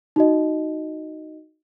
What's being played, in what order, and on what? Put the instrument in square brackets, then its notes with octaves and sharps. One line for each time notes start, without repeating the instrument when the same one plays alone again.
[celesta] D#4 F#4 D#5